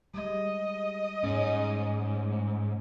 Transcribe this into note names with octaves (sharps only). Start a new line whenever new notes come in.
G3 G#3 D#5
G#2 C#4